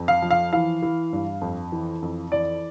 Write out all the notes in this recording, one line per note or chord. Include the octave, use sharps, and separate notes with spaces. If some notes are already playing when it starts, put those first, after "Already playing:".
Already playing: F2
F5
F3
F5
E3 F5
E3
G2
F2
E3
F2
E3 D5